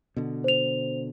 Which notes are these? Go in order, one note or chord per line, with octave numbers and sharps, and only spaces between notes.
B2 D3
C5 F7